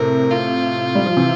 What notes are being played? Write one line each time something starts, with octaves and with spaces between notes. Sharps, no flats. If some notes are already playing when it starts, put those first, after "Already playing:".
Already playing: A2 C3 A#4
F4
G3
F3
C3 E3